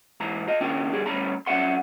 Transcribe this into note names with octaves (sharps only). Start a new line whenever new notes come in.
G#2 E3 A#5
F4 D#5
A#2 D#3 C#4 D4 G5
D3 G3 G#4
D2 G2 C#4 A#5 B5
F#3 C#4 D5 E5 F#5 C6